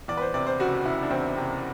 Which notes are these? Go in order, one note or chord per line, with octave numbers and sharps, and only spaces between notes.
E2 D5
B4
C5
C3 D5
C5
F#1 F#4
F#1 E4
D4
E2 C4
C3